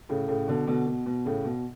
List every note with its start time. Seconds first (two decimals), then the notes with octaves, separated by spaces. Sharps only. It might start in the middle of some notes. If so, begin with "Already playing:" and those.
0.09 A2 C#3
0.28 A2 C#3
0.48 B2 D3
0.67 B2 D3
0.87 B2
1.06 B2
1.25 A2 C#3
1.45 B2